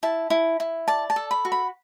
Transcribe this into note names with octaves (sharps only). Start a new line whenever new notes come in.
E4 A5
E4
E4
D5 A5
A5
A4
B5
F#4
B5